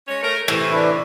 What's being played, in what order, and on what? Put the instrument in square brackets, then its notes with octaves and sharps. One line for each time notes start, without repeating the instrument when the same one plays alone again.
[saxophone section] G#3 C#4 C#5
A3 A#4
[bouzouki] A2 [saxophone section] C3 E3
[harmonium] D4 B4 E5